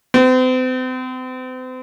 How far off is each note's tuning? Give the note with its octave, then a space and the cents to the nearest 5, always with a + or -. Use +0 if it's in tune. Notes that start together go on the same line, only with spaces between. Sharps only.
C4 -40